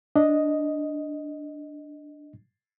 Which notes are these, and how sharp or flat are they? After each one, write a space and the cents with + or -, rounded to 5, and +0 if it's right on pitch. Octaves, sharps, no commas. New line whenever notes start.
D4 +0 D#5 +0